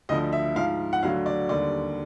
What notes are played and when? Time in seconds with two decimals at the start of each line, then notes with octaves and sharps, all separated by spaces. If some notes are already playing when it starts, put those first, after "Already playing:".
0.09 D2 D3 F3 D#5
0.33 E5
0.56 G#2 F3 F5
0.93 F#5
1.03 D2 D3 F#3 F5
1.26 D5
1.49 D#2 D3 G3 D5